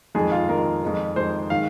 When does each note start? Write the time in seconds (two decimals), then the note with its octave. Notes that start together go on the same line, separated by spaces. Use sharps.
0.15 F2 D#3 G#3 G#4
0.32 F4
0.49 F2 D#3 G#3 A#4
0.83 F2 D#3 G#3
1.16 F2 D#3 G#3 C5
1.50 D#3 G#3 F5